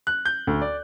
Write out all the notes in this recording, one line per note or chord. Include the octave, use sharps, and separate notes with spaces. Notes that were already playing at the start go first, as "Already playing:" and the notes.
F#6
G6
D2
D5